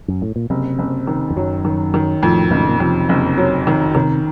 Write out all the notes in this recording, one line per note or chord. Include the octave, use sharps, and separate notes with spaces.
F#2
A2
A#2
F#1 C3
F#1
D#3
F2
F#2 F#3
D#3
D#3
F2 A2
F#1 A#2
A2
A#2
F2 C3
F#1
F#3
D#3
C3 D#3